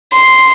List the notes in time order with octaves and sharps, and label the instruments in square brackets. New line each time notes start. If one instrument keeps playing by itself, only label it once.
[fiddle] C6